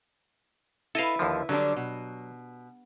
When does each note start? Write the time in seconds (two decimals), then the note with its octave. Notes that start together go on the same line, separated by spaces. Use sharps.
0.95 E4 A4 B4 D#5 F5
1.19 D#2 D3 F3
1.49 D3 F#3 G3 D4
1.76 B2